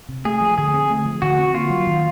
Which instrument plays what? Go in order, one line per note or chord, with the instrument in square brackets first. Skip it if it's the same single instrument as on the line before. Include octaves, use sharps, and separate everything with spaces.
[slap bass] C3
[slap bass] A3 [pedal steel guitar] G#4
[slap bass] F3
[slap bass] D3 [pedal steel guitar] G#4
[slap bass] C4
A3
F3
[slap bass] D3 [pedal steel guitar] F#4
[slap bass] C4
[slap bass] A#3 [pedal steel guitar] F4
[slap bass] F#3
D#3